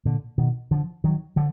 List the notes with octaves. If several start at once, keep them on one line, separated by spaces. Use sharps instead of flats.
A#2 D3
B2 D#3
D3 F3
D#3 F#3
D3 F3